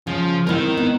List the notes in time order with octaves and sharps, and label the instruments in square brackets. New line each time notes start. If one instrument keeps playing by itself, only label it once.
[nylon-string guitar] C#3 [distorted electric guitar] F3
[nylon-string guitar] C4 E4 [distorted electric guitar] A#4 D#5
[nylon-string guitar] B3